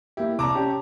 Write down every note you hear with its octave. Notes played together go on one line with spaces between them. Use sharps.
A#3 E4 G4
C3 D5 A5 A#5 D6
C#4 G4 C#5